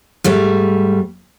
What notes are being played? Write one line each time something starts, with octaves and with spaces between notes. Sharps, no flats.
G#2 G3 A3